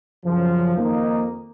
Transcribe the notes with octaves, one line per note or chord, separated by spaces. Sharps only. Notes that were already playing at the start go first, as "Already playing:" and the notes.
F#2 C#3 F3
F2 D#3 A#3 D#4